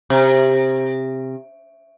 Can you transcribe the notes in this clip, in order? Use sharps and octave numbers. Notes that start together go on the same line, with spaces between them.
C3